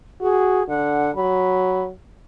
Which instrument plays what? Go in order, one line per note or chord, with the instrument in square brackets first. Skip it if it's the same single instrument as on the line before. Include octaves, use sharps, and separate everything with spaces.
[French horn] F#4 [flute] G#4
[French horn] D3 [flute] F#5
[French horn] F#3 [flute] B5